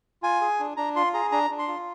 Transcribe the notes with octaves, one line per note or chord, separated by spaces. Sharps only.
F4 G#5
G#4
D4
D4 A#5
F4 C6
G#4 A#5
D4 A#5
D4
C6
F4